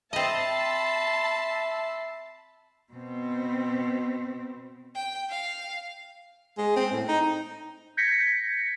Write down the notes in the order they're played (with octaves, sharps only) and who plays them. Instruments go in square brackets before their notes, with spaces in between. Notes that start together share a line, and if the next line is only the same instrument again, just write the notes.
[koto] C4 D#5 [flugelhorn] E5 [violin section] A5 [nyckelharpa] B5 C6
[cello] B2 C4
[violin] G5
F5
[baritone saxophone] G#3
C4
A2
D#4
[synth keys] G6 G#6 A#6 B6 C#7